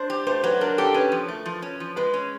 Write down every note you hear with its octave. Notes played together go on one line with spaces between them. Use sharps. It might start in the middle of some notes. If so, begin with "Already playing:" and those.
Already playing: D4 C5
G4
A3 C5
F#3 B4
D4 A#4
G4 A4
C#4 B4
F3
A3
F3
C#4
F3
G#3 B4
C#4